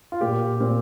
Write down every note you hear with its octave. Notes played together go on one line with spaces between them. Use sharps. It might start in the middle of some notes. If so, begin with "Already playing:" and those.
F4
A#2 G4
A#2 C4